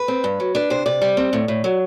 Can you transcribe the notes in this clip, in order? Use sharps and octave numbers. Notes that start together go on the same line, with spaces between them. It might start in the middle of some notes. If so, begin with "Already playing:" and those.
Already playing: B4
C4
G2
F#3
D4 B4
C3 C5
C3 D5
G3
C4
A2
A2
F#3